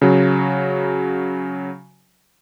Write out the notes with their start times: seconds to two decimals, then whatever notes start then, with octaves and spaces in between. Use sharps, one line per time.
0.02 C#3 F#3